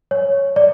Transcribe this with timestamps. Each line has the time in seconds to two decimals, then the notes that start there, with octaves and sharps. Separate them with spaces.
0.11 C#5
0.56 D5